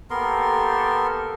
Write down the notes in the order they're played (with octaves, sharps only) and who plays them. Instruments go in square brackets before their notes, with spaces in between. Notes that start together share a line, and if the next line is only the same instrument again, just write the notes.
[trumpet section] A#3 G4 A4 [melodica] B3 A#4 C6